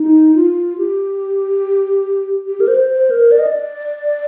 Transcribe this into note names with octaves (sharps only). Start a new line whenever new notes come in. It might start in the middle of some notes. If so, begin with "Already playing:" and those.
Already playing: D#4
F4
G4
G4
A#4
C5
C5
A#4
D5
D#5
D5